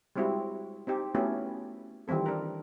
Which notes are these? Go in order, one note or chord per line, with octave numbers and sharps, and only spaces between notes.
G3 G#3 C4 E4 F#4
C4 D#4 G4
A3 B3 C#4 E4 F#4 G4
D#3 E3 G3 C4 A4
D4 A#4